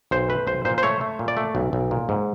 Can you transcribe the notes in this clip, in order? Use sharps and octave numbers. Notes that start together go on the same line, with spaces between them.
B1 C5
A3 B4
B1 C5
A#2 C5
C5
A3 C#5
A3
A#2
D5
A3
B1
B1
A#2
G#2